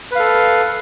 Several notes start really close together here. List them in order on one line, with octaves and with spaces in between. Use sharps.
B4 F5 A4